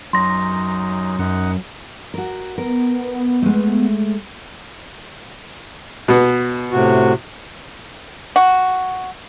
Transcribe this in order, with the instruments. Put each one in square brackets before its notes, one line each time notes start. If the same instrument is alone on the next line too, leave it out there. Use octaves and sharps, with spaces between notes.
[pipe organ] F#2 D#4 [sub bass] F#3 [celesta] C6 A#6
[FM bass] F#2 [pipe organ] D#4 F#5
[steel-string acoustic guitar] F#4 A#4
[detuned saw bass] B3 [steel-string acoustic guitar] A#4
[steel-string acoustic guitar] G#3 A3
[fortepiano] B2 B3
[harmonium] A2 C3 F#4
[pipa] F#4